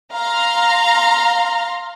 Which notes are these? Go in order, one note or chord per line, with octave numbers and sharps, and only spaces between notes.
F5 A#5 C6